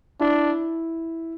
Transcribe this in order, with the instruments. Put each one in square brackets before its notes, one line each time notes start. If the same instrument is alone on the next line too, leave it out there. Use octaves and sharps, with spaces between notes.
[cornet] D4 [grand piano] E4